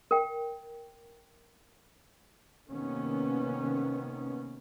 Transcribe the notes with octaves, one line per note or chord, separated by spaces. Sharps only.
A#4 G5
C3 D#3 A#3 B3 C#4